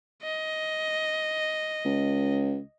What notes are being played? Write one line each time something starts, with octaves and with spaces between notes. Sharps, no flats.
D#5
C#2